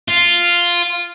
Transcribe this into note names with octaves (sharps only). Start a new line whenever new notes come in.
F4